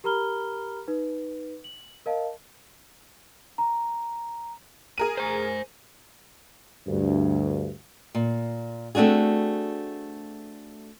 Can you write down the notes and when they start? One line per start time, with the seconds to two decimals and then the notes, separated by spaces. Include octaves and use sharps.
0.04 G4 A#4 A#5 B5 F6 G7
0.88 D#4 B4
1.64 F#7
2.06 A#4 D#5 F5 A5
3.58 A#5
4.98 G#4 A#4 D#7
5.18 C5 G#5
6.87 D2 G2
8.15 A#2
8.95 A3 C4 D4 F#4 G#4